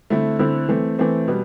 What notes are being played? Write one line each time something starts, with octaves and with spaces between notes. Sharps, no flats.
D3 A3 C4 E4
D3 A3 C4 E4
E3 A3 C4
E3 A3 C4
B2 G3 B3